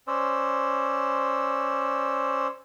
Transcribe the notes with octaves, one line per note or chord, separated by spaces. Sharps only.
C#4 C5 D5 E6